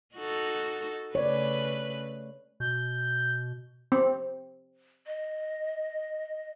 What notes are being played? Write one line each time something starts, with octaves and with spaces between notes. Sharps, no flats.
D#4 F#4 A4
C#3 A3 B4 C#5 D5
B2 G6
C4
D#5